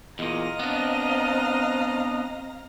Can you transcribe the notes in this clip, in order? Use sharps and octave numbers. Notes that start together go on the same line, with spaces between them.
E2 A#2 D#5 F5 A#5 A#6
B3 C4 D4